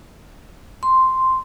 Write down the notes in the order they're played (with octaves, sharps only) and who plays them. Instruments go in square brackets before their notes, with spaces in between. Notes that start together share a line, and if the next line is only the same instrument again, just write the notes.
[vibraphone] C6